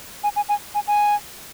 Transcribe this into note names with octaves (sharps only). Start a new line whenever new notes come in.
G#5
G#5
G#5
G#5
G#5